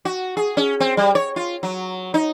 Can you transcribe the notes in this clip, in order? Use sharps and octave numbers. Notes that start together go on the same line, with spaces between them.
F#4
G#4
C#4
C4
G3
C#5
F4
F#3
D#4